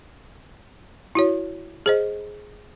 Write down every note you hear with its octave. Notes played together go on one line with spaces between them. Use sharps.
E4 F#4 C#5
G#4 C5 D#5